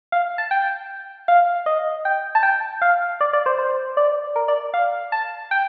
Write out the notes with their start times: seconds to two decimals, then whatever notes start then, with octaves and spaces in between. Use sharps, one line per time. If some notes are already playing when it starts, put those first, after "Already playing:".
0.12 F5
0.38 A5
0.51 G5
1.28 F5
1.66 D#5
2.05 G5
2.35 A5
2.43 G5
2.82 F5
3.21 D5
3.33 D5
3.46 C5
3.59 C5
3.97 D5
4.36 A#4
4.48 D5
4.74 F5
5.12 A5
5.51 G5